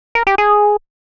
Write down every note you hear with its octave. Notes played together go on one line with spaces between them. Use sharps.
A#4
G4
G#4